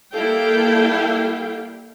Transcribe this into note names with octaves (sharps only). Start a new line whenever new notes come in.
G3 A#3 E4 A4 F5 G5